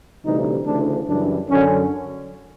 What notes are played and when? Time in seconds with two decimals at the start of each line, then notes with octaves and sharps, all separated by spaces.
0.25 D2 C3 E3 G3 D#4
0.66 D2 C#3 E3 D4
1.08 F#2 C#3 E3 G3 D4
1.50 F#2 D3 F#3 C#4